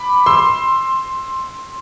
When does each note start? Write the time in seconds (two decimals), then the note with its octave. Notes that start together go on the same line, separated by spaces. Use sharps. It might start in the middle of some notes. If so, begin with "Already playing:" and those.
Already playing: B5 D6
0.26 C6 E6